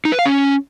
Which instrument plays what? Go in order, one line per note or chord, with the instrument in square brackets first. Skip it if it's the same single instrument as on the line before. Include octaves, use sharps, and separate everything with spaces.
[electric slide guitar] D#4
B4
F5
C#4